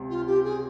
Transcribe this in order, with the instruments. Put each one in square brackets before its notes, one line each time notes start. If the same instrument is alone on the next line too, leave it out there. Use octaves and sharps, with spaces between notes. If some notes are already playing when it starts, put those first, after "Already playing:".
Already playing: [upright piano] C#2 C3
[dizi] F4
G4
G#4